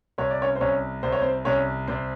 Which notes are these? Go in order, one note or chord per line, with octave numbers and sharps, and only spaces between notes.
C2 C#5
D5
C#4 C#5
C5
C2 C#4 C#5
C2 C5
C#5
C4 C5
C2 C#4 C#5
C2 C4 C5